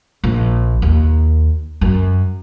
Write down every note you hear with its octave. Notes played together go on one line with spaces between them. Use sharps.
A#1
D#2
F#2